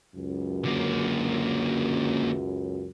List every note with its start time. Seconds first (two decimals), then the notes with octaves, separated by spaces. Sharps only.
0.14 C#2 F#2
0.65 D3 A#3